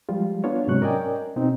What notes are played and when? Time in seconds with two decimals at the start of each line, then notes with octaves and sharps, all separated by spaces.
0.09 F3 G3 G#3 F4
0.44 B3 D4 F4 C#5
0.67 G#2 C3 F#3 G#3 C#6 F#6
0.81 C#4 A#4 D5 D#5 G5 G#5
1.36 B2 C4 D#4